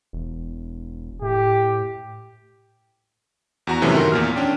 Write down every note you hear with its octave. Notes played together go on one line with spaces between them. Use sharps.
E1
A2 G4
E2 F#4 A#5
F#2 A2 C3 E3 A3 C#4
D#3 F#4 A#4 C6
E2 A#2 F6
C#4 D4 G5